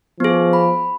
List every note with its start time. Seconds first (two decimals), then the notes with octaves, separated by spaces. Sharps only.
0.20 F3 B3 G#4
0.53 B5